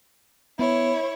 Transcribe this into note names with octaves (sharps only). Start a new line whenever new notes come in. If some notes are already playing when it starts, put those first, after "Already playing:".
B3 E4 C#5